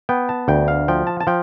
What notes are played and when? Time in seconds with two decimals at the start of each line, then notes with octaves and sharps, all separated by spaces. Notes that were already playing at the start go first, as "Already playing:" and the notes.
0.09 B3 G5
0.29 A5
0.48 D2 G5
0.68 F5
0.88 F3 G5
1.07 A5
1.20 A5
1.27 F3 G5